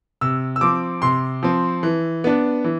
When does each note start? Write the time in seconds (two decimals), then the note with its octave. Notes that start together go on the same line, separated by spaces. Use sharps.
0.21 C3 E6
0.56 E6
0.61 F3 C4 D6
1.02 C3 C6
1.43 F3 C4
1.83 E3
2.24 B3 D4
2.64 E3